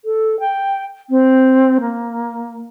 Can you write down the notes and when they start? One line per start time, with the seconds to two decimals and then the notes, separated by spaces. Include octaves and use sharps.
0.05 A4
0.40 G5
1.10 C4
1.81 A#3